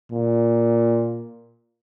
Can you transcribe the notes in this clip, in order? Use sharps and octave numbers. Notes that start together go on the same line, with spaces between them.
A#2